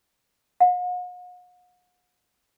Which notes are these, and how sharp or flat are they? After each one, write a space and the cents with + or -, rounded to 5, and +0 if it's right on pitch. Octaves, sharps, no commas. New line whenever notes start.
F#5 -45